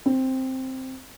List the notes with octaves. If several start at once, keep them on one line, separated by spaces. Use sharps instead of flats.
C4